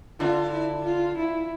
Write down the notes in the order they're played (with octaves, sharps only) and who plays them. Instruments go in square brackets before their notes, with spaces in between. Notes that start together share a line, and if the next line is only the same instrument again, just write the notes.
[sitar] D3 [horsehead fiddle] F4
[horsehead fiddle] E4
F4
E4